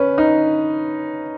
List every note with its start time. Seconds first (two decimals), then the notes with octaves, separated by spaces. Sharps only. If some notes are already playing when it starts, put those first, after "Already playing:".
Already playing: C#4 B4
0.18 D#4